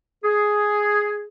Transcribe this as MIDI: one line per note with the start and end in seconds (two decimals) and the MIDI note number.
0.24 1.25 68